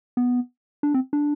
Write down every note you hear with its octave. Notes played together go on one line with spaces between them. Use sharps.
B3
D4
C4
D4